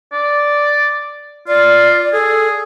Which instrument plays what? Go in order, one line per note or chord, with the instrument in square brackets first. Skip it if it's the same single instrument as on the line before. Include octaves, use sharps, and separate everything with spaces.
[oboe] D5
[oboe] F4 [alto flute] D5
[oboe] G#4 [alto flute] A4